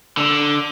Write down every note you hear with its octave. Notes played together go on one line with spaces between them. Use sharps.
D3